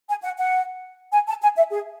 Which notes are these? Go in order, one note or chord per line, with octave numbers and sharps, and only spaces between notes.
G#5
F#5
F#5
G#5
A5
G#5
E5
G#4